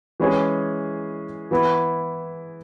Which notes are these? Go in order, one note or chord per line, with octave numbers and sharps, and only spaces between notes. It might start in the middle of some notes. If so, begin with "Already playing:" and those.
E3 G#3 C#4 G#4
E3 B3 E4